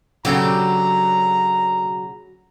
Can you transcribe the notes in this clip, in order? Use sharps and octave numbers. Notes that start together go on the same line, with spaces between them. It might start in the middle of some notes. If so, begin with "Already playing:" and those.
C#3 F#3 D4 G4 A4 G5 A#5